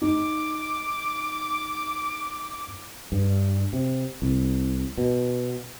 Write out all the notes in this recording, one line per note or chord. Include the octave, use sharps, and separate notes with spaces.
D#4 D6
G2
C3
C2
B2